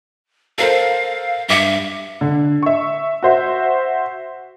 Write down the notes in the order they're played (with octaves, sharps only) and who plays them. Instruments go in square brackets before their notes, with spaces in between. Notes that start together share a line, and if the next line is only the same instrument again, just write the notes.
[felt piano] A4 A#4 C5 [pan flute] F5
[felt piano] G2 D6 C#7 [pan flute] E5
[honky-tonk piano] D3
E5 C#6
F#4 C5 E5